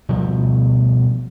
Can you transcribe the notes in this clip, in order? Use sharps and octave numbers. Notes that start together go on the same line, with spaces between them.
B2 F3 G3 A3